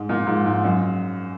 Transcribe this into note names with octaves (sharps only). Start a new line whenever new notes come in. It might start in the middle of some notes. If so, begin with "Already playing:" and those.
Already playing: G#2
A#2
G#2
G#2
F#2